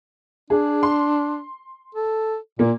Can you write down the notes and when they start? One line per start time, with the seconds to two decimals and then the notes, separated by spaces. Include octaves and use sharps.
0.50 D4 G#4
0.83 C6
1.95 A4
2.59 A#2 A#3